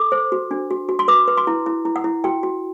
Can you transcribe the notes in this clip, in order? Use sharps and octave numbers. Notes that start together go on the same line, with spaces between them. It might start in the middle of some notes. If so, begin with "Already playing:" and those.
Already playing: A4 D6
C5
F#4
D4
F#4
F#4
C6
B4 D6
B4
C6
E4
E4
E4
F#5
E4
F#4 G5
F#4